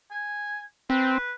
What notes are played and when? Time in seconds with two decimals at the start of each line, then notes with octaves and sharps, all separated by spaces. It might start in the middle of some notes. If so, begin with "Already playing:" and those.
0.11 G#5
0.90 C4 B4